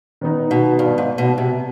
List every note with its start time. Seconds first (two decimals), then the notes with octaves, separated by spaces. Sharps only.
0.21 D#3 B3 D#4
0.51 B2
0.79 G2
0.98 G#2
1.18 B2
1.38 C3